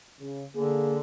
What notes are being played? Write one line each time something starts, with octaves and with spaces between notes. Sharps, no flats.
C#3
D3 A#3 G#4